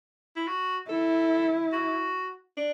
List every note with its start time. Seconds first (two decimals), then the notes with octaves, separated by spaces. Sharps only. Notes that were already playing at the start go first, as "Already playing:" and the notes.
0.36 E4
0.47 F#4
0.89 E4 A4
1.72 F#4
2.57 D4